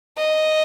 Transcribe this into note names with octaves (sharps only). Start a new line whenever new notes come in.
D#5